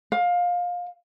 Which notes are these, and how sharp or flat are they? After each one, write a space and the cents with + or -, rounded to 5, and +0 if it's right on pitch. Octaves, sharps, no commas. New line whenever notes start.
F5 +20